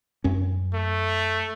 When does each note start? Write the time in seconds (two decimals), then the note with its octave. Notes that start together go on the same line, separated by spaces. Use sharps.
0.24 F#2 C#4
0.74 A3